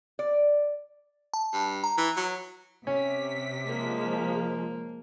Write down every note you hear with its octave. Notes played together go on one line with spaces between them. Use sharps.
D5
A5
G2
A#5
E3
F#3
C3 C#4 B6
F3 G#3 A#3